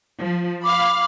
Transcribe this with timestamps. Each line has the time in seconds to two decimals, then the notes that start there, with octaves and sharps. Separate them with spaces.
0.19 F3
0.64 F5 B5 D6